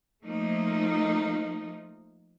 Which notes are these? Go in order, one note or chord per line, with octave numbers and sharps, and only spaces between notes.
F3 A3 A#3 D#4